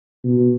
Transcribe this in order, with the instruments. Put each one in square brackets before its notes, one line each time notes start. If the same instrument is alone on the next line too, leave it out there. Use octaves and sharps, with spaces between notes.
[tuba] B2